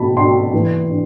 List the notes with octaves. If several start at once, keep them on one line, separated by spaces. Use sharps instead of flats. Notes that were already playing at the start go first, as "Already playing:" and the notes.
Already playing: B2 G#3 A5 B5
D4 C6
E3
D4